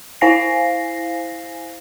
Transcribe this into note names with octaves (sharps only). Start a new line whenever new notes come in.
E4 C5 F5 G#5 A#6 C7